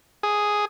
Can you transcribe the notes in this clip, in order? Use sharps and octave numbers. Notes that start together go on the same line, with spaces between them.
G#4